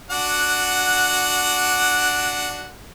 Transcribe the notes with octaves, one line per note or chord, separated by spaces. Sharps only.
D4 F#4 F#5